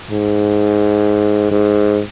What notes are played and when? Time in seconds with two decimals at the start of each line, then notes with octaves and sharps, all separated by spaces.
0.11 G#2
1.51 G#2